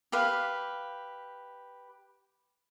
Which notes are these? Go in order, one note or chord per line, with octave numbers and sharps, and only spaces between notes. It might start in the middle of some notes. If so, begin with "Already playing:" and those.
G4 B4 F5